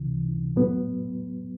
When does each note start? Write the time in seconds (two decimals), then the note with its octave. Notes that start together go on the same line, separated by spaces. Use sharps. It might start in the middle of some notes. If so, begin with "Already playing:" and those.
Already playing: C#2 C3 E3
0.56 A2 F#3 B3